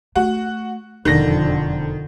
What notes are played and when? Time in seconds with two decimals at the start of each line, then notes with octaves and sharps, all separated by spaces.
0.15 A3 F#4
1.05 E1 F2 D3 D#3 E4 A#6